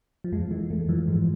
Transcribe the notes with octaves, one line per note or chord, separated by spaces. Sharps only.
F3
F2 G#3
E3 G#3
F2 A3
E3 F3
G#2 G#3